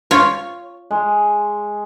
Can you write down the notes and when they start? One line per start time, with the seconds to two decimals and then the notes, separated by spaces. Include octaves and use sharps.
0.11 F4 C#5
0.91 G#3